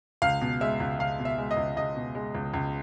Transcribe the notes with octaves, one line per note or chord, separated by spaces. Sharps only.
C#2 F5
B2
G#3 E5
C#2
C#2 F5
B2
E5
G#3
D#5
C#2
C#2 D#5
B2
G#3
C#2
C#2